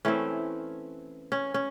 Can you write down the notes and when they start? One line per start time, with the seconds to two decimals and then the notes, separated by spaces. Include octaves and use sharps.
0.05 E3 A3 C4 C#4
1.32 C#4
1.54 C#4